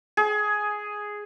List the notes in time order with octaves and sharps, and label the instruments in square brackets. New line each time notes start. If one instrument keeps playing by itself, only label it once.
[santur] G#4